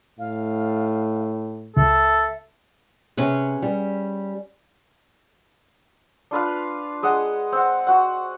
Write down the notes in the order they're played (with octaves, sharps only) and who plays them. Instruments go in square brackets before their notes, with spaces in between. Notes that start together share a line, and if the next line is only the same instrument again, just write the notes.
[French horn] A2 [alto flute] F5
[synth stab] C#2 [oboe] A4 [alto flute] E5
[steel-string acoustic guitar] C3 [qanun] C#4 G#4 B4
[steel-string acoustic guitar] G3
[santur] D4 F4 B4 F5
G#3 D#5 F#5
C4 F#5
F#4 F#5